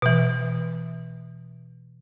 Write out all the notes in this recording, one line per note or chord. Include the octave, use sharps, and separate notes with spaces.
B2 E3